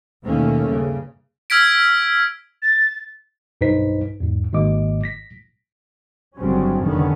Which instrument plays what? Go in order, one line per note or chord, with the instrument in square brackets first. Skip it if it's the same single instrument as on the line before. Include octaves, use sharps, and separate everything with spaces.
[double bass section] D#2 B2 D#3 A3 A#3 C#4
G2 C#3
[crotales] E6 F6 G#6 B6 D7
[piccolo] A6
[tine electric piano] B1 G2 D#4 B4 C5 B6
E2 G#2
G#1 G#2 D#3 A#3 D#5 D6
A#6 B6
[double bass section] G1 C#3 F#3 G3 C4 C#4
F1 D3 D#3 B3 C#4